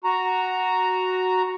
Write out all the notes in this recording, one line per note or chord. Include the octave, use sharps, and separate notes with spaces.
F#4 A#5